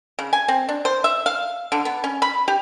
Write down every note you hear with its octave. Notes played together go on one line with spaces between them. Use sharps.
C#3
G#5
C4
D4
C5
E5
F5
D3
B3
C#4
B5
G4